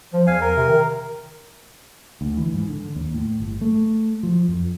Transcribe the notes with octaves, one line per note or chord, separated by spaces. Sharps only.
F3
E2 F5 G#5
A#4
C3
D#3
D2
E3
G#2
D3
D#2
A2
G1
A3
F3
F2